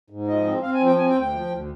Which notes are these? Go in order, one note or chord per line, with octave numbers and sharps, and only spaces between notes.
G#2
F3 D#5
C4
C4 F5
G#5
F3
G5
C4 G#5
G5
D2
G5
F3
D2